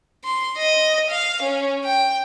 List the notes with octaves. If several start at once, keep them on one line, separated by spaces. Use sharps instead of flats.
C6
D#5
F5
C#4
G5